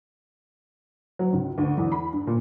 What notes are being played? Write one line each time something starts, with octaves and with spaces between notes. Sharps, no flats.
F#3
C#2
D2
E2
B5
G2
A#2